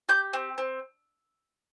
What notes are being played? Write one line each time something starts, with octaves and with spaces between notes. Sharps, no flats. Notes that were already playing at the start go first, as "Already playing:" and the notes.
G4 G6
C4
C4